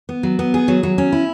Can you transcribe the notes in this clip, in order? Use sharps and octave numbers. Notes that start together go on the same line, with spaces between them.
B3
F#3
B3
G#4
F#3
F#3
C#4
E4